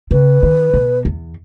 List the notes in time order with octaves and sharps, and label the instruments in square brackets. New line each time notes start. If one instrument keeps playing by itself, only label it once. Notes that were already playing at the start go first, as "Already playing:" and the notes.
[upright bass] C#3 [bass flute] B4
[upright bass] D#3
B2
E2